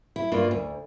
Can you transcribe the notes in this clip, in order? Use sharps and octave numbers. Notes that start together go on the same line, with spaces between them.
E4
G2 A#3 D4 F4
D2